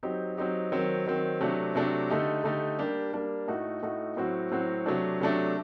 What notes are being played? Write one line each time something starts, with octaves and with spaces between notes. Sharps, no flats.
F#3 C4 D#4 G4
F#3 C4 D#4 G4
D#3 F#3 C4
D#3 F#3 C4
C3 F#3 A3 D4
C3 F#3 A3 D4
D3 A3 D#4 G4
D3 A3 D#4 G4
G3 A#3 D4 G4
G3 A#3 D4 G4
A2 A3 D#4 F#4
A2 A3 D#4 F#4
A2 F#3 C4 F#4
A2 F#3 C4 F#4
C3 F#3 A3 D4
C3 F#3 A3 D4